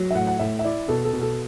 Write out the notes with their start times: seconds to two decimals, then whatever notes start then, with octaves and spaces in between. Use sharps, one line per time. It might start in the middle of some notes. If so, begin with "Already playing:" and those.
Already playing: F#3
0.11 E5
0.15 A2 F#5
0.27 F#5
0.39 A2 E5
0.59 E5
0.64 E4 D5
0.88 B2 A4
1.05 A4
1.13 B2
1.21 A4